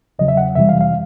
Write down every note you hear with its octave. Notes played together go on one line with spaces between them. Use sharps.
E2 C#3 F#3 D#5
E5
F#5
F2 C3 E3 G3 E5
F5
F5